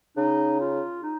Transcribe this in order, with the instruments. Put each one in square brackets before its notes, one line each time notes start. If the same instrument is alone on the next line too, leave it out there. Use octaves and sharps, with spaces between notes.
[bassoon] C#3 [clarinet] D#4
[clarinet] F4
D#4